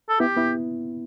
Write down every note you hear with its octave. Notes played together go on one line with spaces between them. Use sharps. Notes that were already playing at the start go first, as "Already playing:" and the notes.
A4
B3 E4 G4
B3 E4